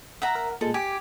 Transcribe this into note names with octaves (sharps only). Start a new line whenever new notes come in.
E5 F#5 A#5
A#4
A#2 G#3 A4
G4 G#5 D6